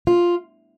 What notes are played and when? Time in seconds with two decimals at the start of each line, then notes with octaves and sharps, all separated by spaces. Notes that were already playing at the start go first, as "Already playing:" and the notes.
0.07 F4